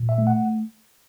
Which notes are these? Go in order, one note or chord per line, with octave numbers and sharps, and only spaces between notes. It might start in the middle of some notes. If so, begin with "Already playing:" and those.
Already playing: A#2
E5
A3
F#5